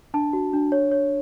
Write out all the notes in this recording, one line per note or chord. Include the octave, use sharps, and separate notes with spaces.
D4 A5
F#4
D4
C#5
C#5